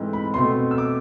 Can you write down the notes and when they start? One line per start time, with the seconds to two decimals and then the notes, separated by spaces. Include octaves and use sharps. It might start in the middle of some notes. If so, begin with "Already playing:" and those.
Already playing: G#2 E3 A3 C4
0.13 B5
0.34 B2 A3 C4 C6
0.71 E6
0.78 D6